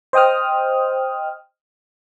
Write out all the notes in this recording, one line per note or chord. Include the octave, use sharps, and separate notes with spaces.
C5 D#5 G5 D#6 F6